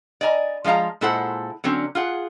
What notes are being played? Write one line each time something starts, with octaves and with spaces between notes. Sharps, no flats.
D5 D#5 G#5 A#5
F3 G#3 F4 F5 A#5
A#2 G#3 E4 A4 C5 F#5
D3 F#3 C4 C#4
F4 G#4 F#5